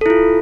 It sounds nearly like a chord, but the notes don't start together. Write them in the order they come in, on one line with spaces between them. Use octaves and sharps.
A4 E4 F4